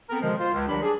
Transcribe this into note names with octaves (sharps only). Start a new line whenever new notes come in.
B3 C4 A4 A#4
B2 D3 D#3 F3 G#3
F4 C5
C#2
D#3 F#3 G3 D4 G4 B5
D4 G#4